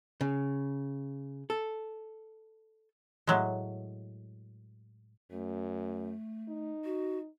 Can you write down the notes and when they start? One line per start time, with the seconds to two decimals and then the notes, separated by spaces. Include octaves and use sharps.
0.21 C#3
1.50 A4
3.27 A2 F#3 G#3
5.31 F#2 A3
6.49 D#4
6.85 F#4